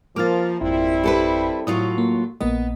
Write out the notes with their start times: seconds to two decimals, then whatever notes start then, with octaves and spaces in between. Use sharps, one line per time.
0.16 F3 A#3 F4 D6 F6 A6
0.61 G#1 F2 G3 C4 E4
1.03 G4 A4 B4
1.67 A2 F#3 F4 D#6
1.98 A#3
2.41 A#1 A#3 B3 D#5